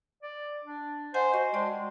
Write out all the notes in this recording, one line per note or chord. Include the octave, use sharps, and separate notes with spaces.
D5
D4
C5 D#5 F#5 G#5
F#4 D#5
G#3 D5 G5 A5